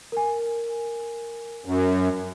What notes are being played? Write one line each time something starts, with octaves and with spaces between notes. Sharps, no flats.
A#4 G#5
F#2